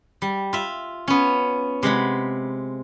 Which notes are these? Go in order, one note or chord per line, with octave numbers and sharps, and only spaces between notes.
G3
F4 E5
B3 C#4
C3 G#3 F#5 B5